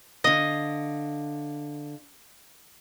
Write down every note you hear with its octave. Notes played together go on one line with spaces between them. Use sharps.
D3 D#5 F5